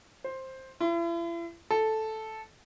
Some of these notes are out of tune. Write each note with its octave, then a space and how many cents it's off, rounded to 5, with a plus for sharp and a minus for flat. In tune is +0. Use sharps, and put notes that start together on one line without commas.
C5 +10
E4 +40
A4 -5